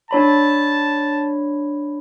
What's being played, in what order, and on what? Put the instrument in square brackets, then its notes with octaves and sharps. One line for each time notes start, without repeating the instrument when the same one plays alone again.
[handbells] D4 C#5 B5 [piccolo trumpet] A5